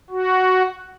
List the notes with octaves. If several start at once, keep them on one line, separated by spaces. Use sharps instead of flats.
F#4